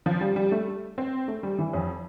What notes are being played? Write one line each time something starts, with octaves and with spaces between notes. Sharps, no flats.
F3
G3
G3
A3
C4
A3
G3
E3
F2